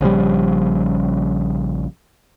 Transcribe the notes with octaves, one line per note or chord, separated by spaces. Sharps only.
A#1 C#3 F3 G3